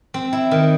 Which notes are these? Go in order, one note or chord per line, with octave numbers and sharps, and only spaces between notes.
C4
E4
D#3